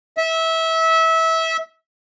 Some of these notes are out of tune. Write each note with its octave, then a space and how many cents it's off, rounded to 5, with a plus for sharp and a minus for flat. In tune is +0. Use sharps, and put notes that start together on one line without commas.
E5 -20